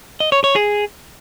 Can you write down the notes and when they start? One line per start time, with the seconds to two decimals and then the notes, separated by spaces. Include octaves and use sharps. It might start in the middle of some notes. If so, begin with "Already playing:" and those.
0.20 D#5
0.32 C#5
0.44 C#5
0.56 G#4